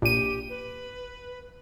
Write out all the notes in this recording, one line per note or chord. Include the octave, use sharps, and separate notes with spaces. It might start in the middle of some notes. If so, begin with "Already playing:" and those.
A#1 G4 D#7
B4